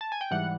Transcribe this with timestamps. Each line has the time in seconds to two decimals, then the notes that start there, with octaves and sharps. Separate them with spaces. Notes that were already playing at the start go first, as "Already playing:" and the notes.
0.01 A5
0.12 G#5
0.21 G5
0.31 G#2 E3 G3 F#5